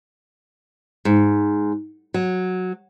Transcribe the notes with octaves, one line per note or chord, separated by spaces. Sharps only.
G#2
F#3